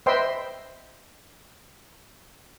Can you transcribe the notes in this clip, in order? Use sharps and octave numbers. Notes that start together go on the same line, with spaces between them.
B4 C5 D#5 E5 G5 C6